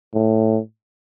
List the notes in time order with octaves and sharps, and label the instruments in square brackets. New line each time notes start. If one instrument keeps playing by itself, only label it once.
[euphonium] A2